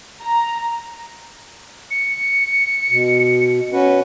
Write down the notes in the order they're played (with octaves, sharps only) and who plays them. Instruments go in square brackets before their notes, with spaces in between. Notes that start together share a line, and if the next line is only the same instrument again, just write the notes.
[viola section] A#5
[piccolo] C#7
[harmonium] B2
C#4 F#4 B4